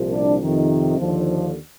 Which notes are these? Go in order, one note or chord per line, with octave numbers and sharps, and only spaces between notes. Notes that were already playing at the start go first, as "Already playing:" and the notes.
Already playing: C2 A#2 F3
D4
F2 C3 D#3
D#2 D3 F3